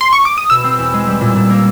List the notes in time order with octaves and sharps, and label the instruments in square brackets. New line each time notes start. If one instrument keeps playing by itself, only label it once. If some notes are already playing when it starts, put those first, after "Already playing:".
[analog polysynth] C6
C#6
D6
D#6
[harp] B2 [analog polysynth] E6
[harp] C4
E2
G#3
G3
A#2
A#2
A#3